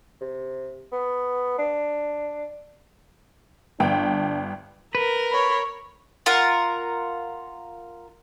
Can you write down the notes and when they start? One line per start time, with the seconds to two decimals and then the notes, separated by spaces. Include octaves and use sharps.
0.21 C3
0.92 B3
1.58 D4
3.80 G1 D4 G5
4.95 A#4 B4
5.31 C#5 B5
6.26 F4 A#4 F#5